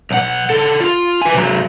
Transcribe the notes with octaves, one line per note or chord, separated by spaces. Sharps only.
B1 F#5
C#3 A4
F4
B4 G#5
C3 F#3